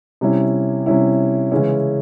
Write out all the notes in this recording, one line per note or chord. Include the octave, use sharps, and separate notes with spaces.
C3 G3 C#4 E4
C3 G3 C#4 E4
C#3 E3 G#3 C#4 E4